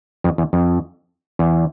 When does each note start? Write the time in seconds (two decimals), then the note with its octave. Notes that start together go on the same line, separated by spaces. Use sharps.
0.24 F2
0.38 E2
0.53 F2
1.39 E2